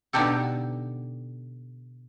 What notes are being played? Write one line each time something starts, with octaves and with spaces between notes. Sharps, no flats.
B2 D3 D#4 G4 A4